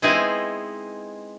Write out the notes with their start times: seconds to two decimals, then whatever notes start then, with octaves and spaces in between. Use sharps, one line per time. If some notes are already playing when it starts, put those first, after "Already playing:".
0.02 G#3 B3 C4 D#4 E4 G#4